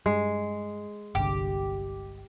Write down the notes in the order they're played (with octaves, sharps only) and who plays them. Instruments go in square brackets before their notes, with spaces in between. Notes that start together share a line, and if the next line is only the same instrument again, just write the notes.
[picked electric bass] G2 [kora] G#3
[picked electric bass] G1 C2 D3 [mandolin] G4